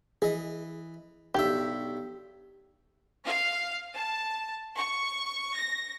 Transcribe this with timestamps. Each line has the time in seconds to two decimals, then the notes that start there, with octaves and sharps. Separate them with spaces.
0.22 E3 G#4 D#5
1.35 B1 G2 G4 E5
3.25 F5
3.95 A5
4.75 C#6
5.56 A#6